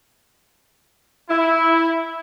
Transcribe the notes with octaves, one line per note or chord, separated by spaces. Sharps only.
E4